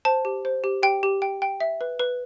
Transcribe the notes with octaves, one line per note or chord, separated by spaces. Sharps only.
C5 A5
G4
C5
G4
G4 G5
G4
G5
G5
E5
B4
B4